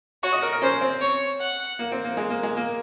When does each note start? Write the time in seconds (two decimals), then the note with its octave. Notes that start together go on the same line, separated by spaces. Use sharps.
0.23 F#4 C#5
0.32 D#5
0.42 A#4
0.53 A#4
0.62 C#4 C5
0.81 C4
1.01 C#5
1.40 F#5
1.79 A#3
1.92 C4
2.04 A#3
2.17 G#3
2.30 A#3
2.43 G#3
2.57 A#3